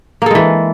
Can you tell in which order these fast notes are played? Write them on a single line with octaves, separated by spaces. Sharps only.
A#3 A4 G#3 E3